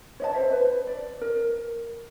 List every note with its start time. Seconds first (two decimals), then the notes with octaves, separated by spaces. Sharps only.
0.20 C#5 D#5 A5
0.34 C5 E5
0.52 B4
0.87 D5
1.21 A#4